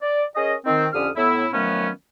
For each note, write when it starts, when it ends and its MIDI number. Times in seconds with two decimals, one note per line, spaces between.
0.02 0.24 74
0.36 0.54 61
0.36 0.54 68
0.36 0.54 70
0.36 0.54 75
0.66 0.87 51
0.66 0.87 60
0.93 1.09 41
0.93 1.09 50
0.93 1.09 61
0.93 1.09 67
0.93 1.09 87
0.93 1.09 89
1.17 1.46 45
1.17 1.46 59
1.17 1.46 64
1.54 1.89 51
1.54 1.89 53
1.54 1.89 54
1.54 1.89 57
1.54 1.89 59
1.54 1.89 61